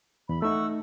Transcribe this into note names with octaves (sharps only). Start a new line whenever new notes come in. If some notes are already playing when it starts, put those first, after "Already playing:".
E2 B5
A3 D#4 F#5 C#6 E6